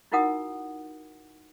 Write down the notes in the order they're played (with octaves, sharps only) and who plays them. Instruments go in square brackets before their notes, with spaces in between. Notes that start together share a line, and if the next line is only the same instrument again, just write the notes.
[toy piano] D#4 E4 F#4 A#4 F#5 D#6